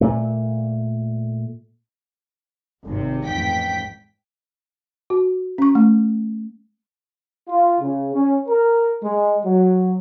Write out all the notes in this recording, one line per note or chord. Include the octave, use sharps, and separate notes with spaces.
A#2 A3
G#1 C3
A1 F2 G#2 G5 B6
F#4
C#4 C#6
A3
F4
C#3
C#4
A#4
G#3
F#3